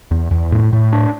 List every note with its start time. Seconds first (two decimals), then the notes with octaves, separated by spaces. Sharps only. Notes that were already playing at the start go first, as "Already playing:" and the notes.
0.11 E2
0.31 E2
0.52 A2
0.73 A2
0.93 D4